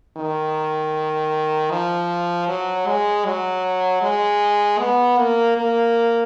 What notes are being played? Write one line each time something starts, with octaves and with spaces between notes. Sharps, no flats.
D#3
F3
F#3
G#3
F#3
G#3
B3
A#3
A#3